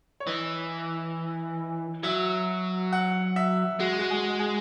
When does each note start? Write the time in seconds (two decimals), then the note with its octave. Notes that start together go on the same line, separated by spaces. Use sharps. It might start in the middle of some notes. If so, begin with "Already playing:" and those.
0.20 C#5
0.27 E3 D#5
2.03 F#3 E5
2.93 F#5
3.36 E5
3.80 G#3 F#4
3.99 F#4
4.10 G#4
4.39 G#4